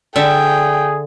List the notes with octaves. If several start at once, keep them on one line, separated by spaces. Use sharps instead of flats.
D3 G#4 E5 G5